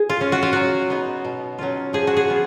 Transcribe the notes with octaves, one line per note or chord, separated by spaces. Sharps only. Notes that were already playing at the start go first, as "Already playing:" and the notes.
Already playing: G#4
F4
C#4 F4
F#4
F4
F#3 F#4
B3 D#4
B2
F#3 C#4 F4
F3 G#4
F#4
G#4
B3 F4